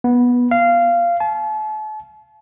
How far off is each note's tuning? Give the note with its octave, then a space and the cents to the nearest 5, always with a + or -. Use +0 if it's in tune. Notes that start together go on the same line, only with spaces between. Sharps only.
B3 -15
F5 -15
A5 -40